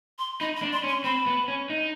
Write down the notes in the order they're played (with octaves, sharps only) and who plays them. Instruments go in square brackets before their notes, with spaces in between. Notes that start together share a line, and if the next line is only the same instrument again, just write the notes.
[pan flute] C6
[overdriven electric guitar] D#4 [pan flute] B5
[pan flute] B5
[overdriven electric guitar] D4
[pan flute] C6
[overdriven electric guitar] C#4
[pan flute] C6
[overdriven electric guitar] C4 [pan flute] B5
[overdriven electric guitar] B3
C#4
D#4